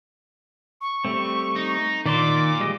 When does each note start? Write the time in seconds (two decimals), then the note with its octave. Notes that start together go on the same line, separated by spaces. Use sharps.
0.81 C#6
1.05 G3 A3 C4
1.56 D#4
2.06 A#2 D#3 D5 C6 D6
2.60 G3 G#3 D#5